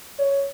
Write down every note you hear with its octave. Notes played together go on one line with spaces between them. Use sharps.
C#5